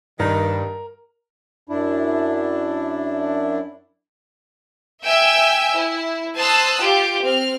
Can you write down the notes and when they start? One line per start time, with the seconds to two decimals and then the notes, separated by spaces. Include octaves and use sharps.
0.20 G2 D#3 A#4
1.69 F#2 D4 E4
5.04 E5 G5 G#5 E6
5.75 E4
6.36 C5 A5 D#6 E6 F#6
6.81 F4 G4
7.23 C4 F6